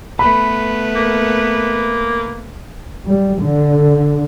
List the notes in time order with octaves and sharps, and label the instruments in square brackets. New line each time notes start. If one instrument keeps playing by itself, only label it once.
[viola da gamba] A3 B3 B4 [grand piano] B5
[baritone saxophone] A#3
[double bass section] G3
D3